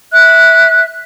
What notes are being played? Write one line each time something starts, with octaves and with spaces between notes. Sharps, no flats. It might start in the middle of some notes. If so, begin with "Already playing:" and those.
E5 F#6